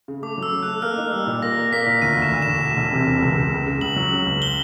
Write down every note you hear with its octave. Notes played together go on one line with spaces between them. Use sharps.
C#3
A3 D6
F#3 E6
C#3
F#6
A3
A#3 F6
D#4
G3 E6
A#2
A#3 A#6
A#3
A#3 B6
A#2
D2 D#7
D2 E7
D2
E1 E7
E1
E1
C3
E1
C#2
C#3
C#2
C#3
C#2 F#7
F#3
C#3
C#2
G7